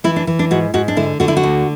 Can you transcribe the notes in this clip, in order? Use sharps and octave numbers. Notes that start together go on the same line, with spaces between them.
E3 E4
D4
E3
D4
G#2 F#4
G#2 F#4
D4
D3 E4
D3 F#4
E4
F#4
D2